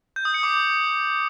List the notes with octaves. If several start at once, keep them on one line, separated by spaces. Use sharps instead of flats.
G6
D#6
C#7
D6